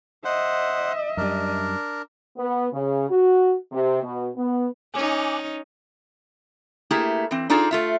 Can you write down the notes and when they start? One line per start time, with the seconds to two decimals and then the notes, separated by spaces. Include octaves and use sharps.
0.25 C5 D#5 E5 F#5
1.17 F#2 G3 D4 A#4
2.38 B3
2.73 C#3
3.10 F#4
3.72 C3
4.03 B2
4.37 B3
4.94 C#4 D#4 G#5 D6 F#6
6.91 A3 A#3 E4 G4 G#4
7.31 E3 C4
7.50 D4 D#4 F4 G#4 A4 D5
7.71 A3 F4 E5